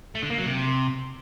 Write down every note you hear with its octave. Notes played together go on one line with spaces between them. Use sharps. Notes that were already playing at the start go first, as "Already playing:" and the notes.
A3
D3
A#3
F#3
C3